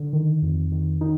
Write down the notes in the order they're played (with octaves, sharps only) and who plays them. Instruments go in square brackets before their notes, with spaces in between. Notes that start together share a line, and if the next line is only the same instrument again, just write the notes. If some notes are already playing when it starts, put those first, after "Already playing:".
Already playing: [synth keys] D3
D#3
F2
D#3
D#3 D#4